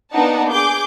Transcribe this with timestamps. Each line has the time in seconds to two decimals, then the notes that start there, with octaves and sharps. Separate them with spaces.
0.14 A#3 B3 D4 D#4 F#5 A5
0.50 G#4 D6 G6